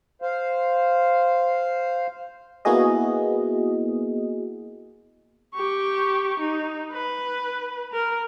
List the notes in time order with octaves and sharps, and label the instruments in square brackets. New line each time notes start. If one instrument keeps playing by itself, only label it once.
[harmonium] C5 F5
[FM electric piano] A#3 B3 E4 F#4 G#4 D#5
[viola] G4 C#6
D#4
B4
A#4